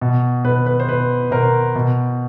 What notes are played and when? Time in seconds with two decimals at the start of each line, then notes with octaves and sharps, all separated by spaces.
0.01 B2
0.45 B2 B4
0.66 B4
0.80 C5
0.88 B2 B4
1.31 B2 A#4 C5
1.75 B2